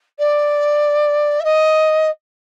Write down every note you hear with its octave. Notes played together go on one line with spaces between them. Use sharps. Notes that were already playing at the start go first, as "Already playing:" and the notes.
D5
E5
D#5